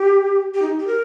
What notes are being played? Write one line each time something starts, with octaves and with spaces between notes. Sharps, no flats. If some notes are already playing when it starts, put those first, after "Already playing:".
Already playing: G4
G4
D#4
G4
A#4